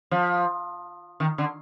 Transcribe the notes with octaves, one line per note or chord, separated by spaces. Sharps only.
F3
D#3
D3